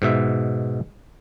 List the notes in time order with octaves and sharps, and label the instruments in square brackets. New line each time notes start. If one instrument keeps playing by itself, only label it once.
[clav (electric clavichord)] G#2 B2 E5